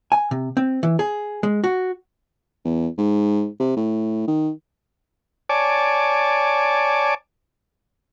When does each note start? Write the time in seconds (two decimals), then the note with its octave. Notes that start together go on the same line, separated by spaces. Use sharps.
0.12 G#5
0.31 C3
0.57 C4
0.83 E3
0.99 G#4
1.43 G#3
1.64 F#4
2.65 E2
2.98 G#2
3.60 C3
3.76 A2
4.28 D#3
5.49 C#5 D5 G#5 A5 D6